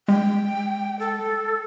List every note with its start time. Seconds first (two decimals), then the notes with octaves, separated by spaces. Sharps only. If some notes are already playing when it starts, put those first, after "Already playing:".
0.08 G#3 G5
0.99 A4